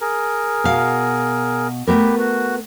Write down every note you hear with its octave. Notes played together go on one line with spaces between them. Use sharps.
G#4 A#4
B2 F5
A3 B3 G4 A#4 B4
F#4